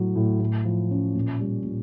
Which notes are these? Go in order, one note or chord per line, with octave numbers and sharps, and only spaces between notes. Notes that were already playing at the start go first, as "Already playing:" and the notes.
Already playing: A2 F#3
A2
A2
F3
C#4
A#2
G3
A#2